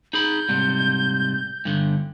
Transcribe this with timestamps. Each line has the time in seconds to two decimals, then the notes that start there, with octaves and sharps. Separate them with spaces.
0.13 D#4 G#4 B5 G6
0.49 G#2 C3 G3
1.65 G2 D3